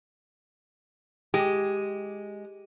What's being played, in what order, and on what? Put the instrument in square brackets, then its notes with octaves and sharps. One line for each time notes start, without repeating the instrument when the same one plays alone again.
[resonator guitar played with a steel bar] G#3 [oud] G4